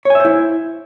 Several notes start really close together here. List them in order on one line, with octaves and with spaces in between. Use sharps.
C#5 G#5 E5 C5 E4